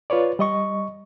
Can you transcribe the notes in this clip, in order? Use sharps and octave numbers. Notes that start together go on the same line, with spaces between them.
F4 B4 C#5 D5
G3 D#5 C#6